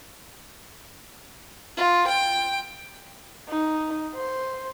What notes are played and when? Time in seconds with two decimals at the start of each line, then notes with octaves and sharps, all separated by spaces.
1.77 F4
2.07 G5
3.48 D#4
4.15 C5